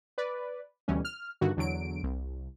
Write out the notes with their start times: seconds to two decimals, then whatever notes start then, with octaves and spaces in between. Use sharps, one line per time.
0.18 B4 D5
0.88 D2 B2 E3 G3 C#4
1.05 F6
1.41 G2 D3 D#3 F#4
1.57 E2 D3 F#3 D7
2.03 C2